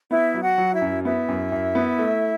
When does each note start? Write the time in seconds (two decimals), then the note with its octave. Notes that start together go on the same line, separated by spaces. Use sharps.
0.11 B3 E4 E5
0.34 F#3
0.42 F#4 F#5
0.58 F#3
0.73 E4 E5
0.81 F#2
1.04 B3 E4 E5
1.28 F#2
1.52 F#2
1.75 B3
1.98 A3